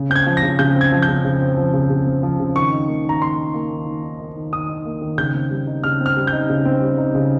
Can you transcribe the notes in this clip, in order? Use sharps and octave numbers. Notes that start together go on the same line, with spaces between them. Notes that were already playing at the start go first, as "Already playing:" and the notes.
Already playing: C#3
C4 G6
G#6
F3
A#6
C#3
C#3 G6
C4
G#6
F3
G6
C#3
C#3
C4
F3
C#3
C#3
C4
F3
C#3
D#3 C#6
D#4
A#3
D#3 A#5
D#3 C6
D#4
A#3
D#3
D#3
D#4
A#3
D#3
D#3 D#6
D#4
A#3
D#3
C#3 G6
C4
G3
D#4
C#3 F6
C4
F6
G3
G6
D#4
C#3
C4
G3
D#4
C#3